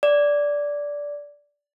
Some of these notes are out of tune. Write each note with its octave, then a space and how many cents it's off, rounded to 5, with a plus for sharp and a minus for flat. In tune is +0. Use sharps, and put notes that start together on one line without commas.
D5 -10